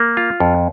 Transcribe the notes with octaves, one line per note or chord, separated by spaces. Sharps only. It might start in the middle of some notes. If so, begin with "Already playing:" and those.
Already playing: A#3
F4
F2